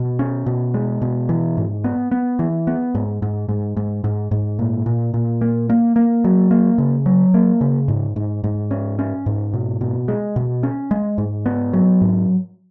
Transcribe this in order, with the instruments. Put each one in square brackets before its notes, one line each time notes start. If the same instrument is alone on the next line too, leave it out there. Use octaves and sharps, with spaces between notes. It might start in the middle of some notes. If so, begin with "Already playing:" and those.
Already playing: [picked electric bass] B2
C#4
B2
G#3
B2
E3
G#2
B3
B3
E3
B3
G#2
G#2
G#2
G#2
G#2
G#2
A#2
A#2
A#2
A#3
A#3
A#3
F#3
A#3
C#3
F#3
A#3
C#3
G#2
G#2
G#2
C#4
C#4
G#2
B2
B2
G#3
B2
C#4
G#3
G#2
B3
F#3
G#2